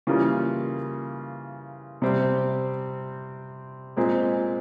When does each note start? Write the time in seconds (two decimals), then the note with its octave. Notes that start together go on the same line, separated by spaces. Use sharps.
0.07 C#3 E3 G3 A#3 F4
2.02 C3 G3 C4
3.96 A#2 G#3 C4